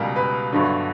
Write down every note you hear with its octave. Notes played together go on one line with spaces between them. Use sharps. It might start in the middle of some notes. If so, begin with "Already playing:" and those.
Already playing: C#2 B2 G3 A#4
B4
G1 G2 D3 F#3